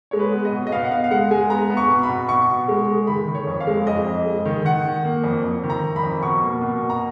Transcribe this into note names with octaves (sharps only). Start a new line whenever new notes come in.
G#3 C#5
B4
B3
D#5
B2
D#5
B3 F5
F#5
B3 F5
F5
G#3 F#5
G#3 G#5
B3 A#5
B3
C#6
B2
B5
B2
B2 C#6
B2
G#3
G#3
D#3 B5
D#3
C#5
F2
F5
G#3
F2 D#5
F2
G#3
D#3
D#3 F#5
D#3
A#3
F2
F2
D#3
A#5
D#3
B5
F2
B2 C#6
A#3
B2
B2
A#5